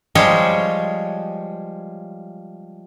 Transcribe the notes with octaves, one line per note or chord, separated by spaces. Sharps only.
F3 G3 G#3 G#4 C#5